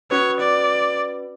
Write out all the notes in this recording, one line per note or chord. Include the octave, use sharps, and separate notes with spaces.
C#4 F#4 B4 C#5
D5